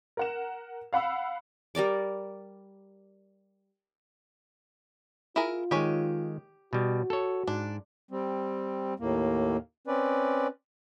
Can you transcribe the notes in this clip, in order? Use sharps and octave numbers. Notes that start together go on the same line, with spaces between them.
A#4 F#5 E7
F5 F#5 B5 E6
G3 A#4 D5 D6
E4 F4 G#4 A#4
D#3 G#3 G4 C#5 G#5
B2 G3 F#4
A4 C#5
G#2 D4
G3 C4
D#2 A2 A#3
C4 C#4 B4 D5